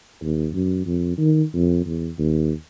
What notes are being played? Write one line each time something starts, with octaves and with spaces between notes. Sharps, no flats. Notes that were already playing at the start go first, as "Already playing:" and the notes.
D#2
F#2
F2
D#3
F2
E2
D#2